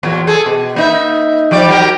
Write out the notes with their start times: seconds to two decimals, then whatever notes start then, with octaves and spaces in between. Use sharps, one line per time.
0.03 E2 A#2 F#3
0.27 G#4 A4
0.46 B2
0.76 A#3 D#4 E5
1.51 F3 G3 D5
1.69 F#3 G4 A#4